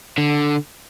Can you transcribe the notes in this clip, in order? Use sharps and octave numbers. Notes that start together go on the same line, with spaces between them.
D3